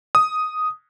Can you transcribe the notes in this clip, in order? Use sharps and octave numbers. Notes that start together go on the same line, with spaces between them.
D#6